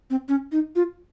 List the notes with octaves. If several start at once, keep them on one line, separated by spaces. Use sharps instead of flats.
C4
C#4
D#4
F4